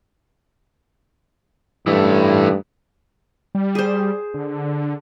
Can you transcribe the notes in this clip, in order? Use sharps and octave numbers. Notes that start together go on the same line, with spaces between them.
G2 E3 A3
G3
G#4 C5
D3